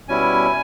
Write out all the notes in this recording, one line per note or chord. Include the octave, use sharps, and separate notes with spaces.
B2 G3 C#4 E4 G#5